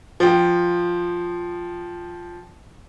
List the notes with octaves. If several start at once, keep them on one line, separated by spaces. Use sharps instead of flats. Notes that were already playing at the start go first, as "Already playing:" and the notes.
F3 G5